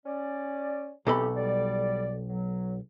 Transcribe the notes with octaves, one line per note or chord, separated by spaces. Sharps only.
C#4 D5
B1 E3 C4 G4 A4 B5
G3 D5
F#3